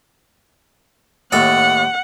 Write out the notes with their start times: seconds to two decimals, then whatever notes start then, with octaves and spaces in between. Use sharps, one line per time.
1.32 D#2 A2 A4 F#5